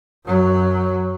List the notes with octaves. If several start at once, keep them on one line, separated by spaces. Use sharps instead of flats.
F#2 F#3